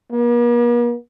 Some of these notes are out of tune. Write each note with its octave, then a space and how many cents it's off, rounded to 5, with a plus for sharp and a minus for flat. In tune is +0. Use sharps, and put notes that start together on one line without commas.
A#3 +45